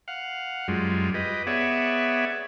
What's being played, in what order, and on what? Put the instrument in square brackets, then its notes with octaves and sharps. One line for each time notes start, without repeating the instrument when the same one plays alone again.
[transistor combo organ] F5 F#5
F#2 G3 G#3 F4
G4 B4 D#5
B3 G#4 C#5 D5 E5 F#5